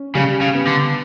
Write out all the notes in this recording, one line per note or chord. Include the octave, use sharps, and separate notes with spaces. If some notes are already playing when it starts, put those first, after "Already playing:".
Already playing: C#4
C#3 G3
C#3
B3
D3